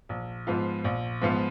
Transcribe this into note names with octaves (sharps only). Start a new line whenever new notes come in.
A#1
G#2 F3 B3 F4
A#1
G#2 F3 B3 F4